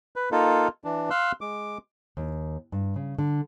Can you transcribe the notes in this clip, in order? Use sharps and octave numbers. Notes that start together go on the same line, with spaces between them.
B4
A#3 D#4 F4 A4
E3 D4
F5 C6 E6 F#6
G#3 D6
D#2
G2
C#3
D3